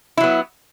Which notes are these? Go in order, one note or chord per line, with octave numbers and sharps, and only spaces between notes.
F#3 B3 E4